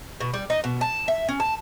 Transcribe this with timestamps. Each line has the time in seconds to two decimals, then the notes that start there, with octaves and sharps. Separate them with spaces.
0.20 B2
0.34 G3
0.50 D#4
0.64 B2
0.81 A5
1.08 E5
1.29 C#4
1.40 A5